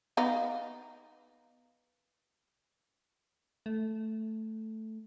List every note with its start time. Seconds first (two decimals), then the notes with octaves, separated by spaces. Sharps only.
0.17 B3 D#4 F5
3.66 A3